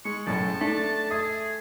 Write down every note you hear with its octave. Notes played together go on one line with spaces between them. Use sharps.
G#3 C#6
F#1 F#2 A2 A5
A3 D4
G#4 A4 E5 D#6